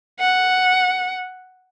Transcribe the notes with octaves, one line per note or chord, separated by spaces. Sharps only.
F#5